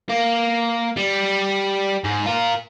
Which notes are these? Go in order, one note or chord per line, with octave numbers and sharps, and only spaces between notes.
A#3
G3
G#2
F4 A#4